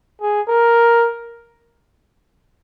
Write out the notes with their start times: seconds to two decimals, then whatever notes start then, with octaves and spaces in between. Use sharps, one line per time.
0.21 G#4
0.49 A#4